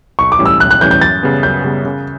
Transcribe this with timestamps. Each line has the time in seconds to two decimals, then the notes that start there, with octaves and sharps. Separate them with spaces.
0.19 B1 C#6
0.32 D6
0.39 A2 E3 G3 C#4
0.46 E6
0.60 B1 F#6
0.71 F#6
0.81 A2 E3 G3 C#4 G6
0.91 G6
1.01 F#2 A6
1.23 C#3 G3 B3
1.43 F#2 G6
1.64 C#3 G3 B3
1.85 C#3